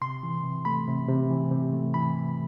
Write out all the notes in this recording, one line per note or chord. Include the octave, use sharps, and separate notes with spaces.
C3 C6
E3
C3
A3 B5
C3
C3
E3
C3
A3
E3 B5